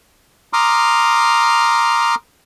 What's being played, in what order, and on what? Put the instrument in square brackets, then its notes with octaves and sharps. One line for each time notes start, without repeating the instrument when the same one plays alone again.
[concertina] A#5 C6 D6 D#6 F6